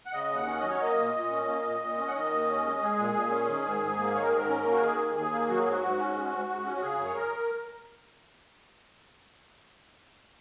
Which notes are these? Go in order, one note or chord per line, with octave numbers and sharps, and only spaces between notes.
F#5
C#3 D#5
D#2 F#5
C#4
D#5
F#3
C#5
A#3 D#5
A#2
A#2
C#4
A#3
A#2
A#2
C#4
F#5
D#3 D#5
D#2
C#4
G#3
G#3 G#4
A#2
A#2
C#4
D#3
G#2
G#2
A#3
D#3 C#5
A#4
G#4
G#2 A#4
C#4
A#3
F#4
D#3 G#4
D#2
D#2 G#4
A#3
F#3 F#4
G#4
G#2 F#4
G#2
C#4
G#3
G#2
G#2
C#4
F#4
C#3 G#4
F#2
C#5
A#4